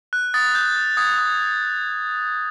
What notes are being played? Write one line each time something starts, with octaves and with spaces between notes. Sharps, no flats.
F#6
D#6 A6
G6
G6
D#6 G#6
D#6